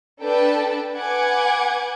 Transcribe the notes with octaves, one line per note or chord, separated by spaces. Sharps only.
D4 A4 B4 G5 A5
B4 F#5 G#5 D6 G#6